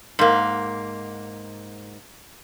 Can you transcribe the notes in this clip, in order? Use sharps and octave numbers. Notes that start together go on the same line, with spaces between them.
G#2 A#3